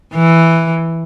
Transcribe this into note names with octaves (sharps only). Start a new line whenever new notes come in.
E3